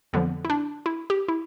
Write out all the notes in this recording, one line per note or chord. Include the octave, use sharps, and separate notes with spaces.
F2 D3 F3 B3
E4
D4
E4
G4
E4